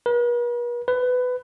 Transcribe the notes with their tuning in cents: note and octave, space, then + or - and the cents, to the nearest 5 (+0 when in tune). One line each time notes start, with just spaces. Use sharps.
B4 -45
B4 +20